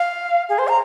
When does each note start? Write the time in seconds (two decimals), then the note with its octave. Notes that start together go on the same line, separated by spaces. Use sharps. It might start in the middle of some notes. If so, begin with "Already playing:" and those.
Already playing: F5
0.49 G#4
0.59 C5
0.68 A#5